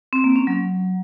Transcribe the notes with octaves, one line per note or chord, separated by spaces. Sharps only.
C4
A#3
C#4
F#3